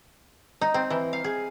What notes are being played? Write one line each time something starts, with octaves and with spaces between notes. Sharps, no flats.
D#4
C4
E3
F5
G#4